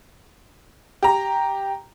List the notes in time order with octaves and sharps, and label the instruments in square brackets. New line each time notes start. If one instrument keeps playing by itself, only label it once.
[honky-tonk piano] G4 A#5